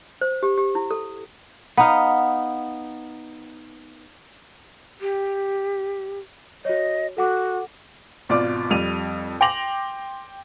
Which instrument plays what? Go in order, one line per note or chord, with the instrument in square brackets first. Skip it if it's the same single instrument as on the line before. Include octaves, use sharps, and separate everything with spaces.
[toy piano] C5
G4
G4
E4
A4
[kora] B3 D#4 F5
[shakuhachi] G4
[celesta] F#4 C#5 [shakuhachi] D#5
[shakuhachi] F#4 [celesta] A4 F#5 D6
[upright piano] G#1 B2 F4 D5 D6
F2 G3 D#7 F7
G5 C6 D6 A#6 F7 F#7